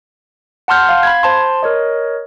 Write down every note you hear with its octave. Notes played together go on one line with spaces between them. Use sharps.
F#5 A5 C6 F6 G6
F5
B5 G#6
C5 A5 C6
A#4 C#5 D#5